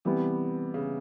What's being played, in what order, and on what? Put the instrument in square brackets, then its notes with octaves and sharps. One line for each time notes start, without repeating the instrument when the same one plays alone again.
[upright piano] C3 [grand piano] E3 G3 B3
[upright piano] C#3